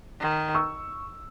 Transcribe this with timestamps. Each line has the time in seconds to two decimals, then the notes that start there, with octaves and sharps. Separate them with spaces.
0.20 D#3
0.55 C#6 E6